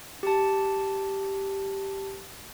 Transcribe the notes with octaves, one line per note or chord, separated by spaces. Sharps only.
G4 A5